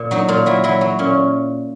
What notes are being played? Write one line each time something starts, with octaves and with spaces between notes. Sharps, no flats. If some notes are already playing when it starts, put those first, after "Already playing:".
Already playing: A#2
F#3 D#4
A#2 F4
F#3 E4
F#3 E4
F#3
A#2 C#4